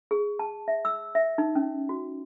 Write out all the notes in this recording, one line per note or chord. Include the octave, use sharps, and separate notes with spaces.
G#4
A5
E5
E6
E5
D#4
C#4
F#4